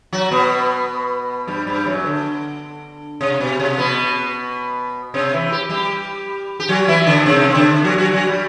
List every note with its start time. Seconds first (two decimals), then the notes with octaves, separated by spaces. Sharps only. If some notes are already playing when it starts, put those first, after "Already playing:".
0.13 F#3 F#4
0.31 B2 B3
1.48 G2 G3
1.67 G2 G3
1.86 F#2 F#3
2.06 D3
3.21 C3
3.40 B2
3.60 C3
3.78 B2 B3
5.14 C3 C4
5.33 E3 E4
5.52 G4
5.69 G3 G4
6.60 G4
6.68 F#3 F#4
6.88 E3 E4
7.03 E4
7.06 D3 D4
7.26 C3 C4
7.50 C4
7.55 D3 D4
7.84 F#3 F#4
7.98 F#3 F#4
8.13 F#3 F#4
8.27 G3